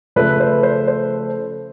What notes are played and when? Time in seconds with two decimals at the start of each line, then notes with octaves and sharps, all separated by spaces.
0.16 C#3 F3 A3 B4
0.40 C5
0.63 C5
0.88 C5